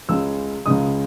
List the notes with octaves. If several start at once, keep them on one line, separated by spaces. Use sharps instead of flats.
C#2 C#3 G#3 E6
C#2 C#3 G#3 D#6